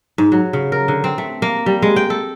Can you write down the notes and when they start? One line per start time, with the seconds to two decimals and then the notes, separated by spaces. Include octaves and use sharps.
0.18 G#2
0.32 F#3
0.53 C#3
0.72 A#4
0.88 D3
1.04 C4
1.18 A3
1.42 A#3
1.66 G3
1.82 G#3
1.96 G5
2.10 A4